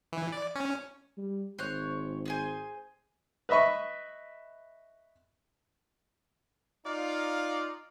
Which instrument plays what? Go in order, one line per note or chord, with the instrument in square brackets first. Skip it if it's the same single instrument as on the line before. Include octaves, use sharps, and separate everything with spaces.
[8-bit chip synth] E3
D5
C#4
[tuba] G3
[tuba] G#1 [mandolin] C5 C#5 F#6
[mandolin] G#4 C5 G#5
[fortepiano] B4 D#5 E5 B5 C#6
[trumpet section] D#4 F4 D5 F5